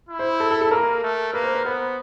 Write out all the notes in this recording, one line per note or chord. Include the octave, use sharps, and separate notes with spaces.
E4
C5
A4
A4
A4
A#3 A#4
A3
A#3 B4
C5
B4
B3 C5